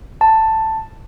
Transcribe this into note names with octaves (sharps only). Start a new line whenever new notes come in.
A5